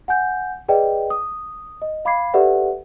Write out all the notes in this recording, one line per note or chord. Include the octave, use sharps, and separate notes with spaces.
F#5 G#5 G6
G#4 B4 D5 D#5 G5
D#6
D#5
F5 B5 D6 G#6 C7
G4 A4 B4 D5 E5 F#5